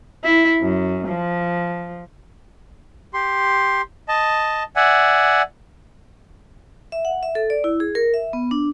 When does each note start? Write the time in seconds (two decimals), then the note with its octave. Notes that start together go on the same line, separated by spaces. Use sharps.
0.24 E4
0.61 F#2
1.08 F3
3.14 G4 C6
4.08 D#5 A5
4.76 D5 E5 F#5 G#5
6.92 E5
7.05 F#5
7.23 E5
7.35 A4
7.50 D5
7.64 E4
7.80 G#4
7.95 A#4
8.14 E5
8.33 B3
8.51 D4